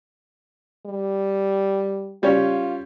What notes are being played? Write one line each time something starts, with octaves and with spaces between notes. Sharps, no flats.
G3
G3 C#4 F4